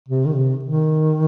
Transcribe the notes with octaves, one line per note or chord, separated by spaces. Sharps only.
C3
D#3
C3
D#3